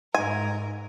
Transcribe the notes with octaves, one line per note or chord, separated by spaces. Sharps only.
G#2 A#4 G#5